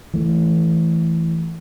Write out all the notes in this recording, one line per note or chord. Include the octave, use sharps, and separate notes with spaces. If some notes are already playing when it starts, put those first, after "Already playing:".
E3 A3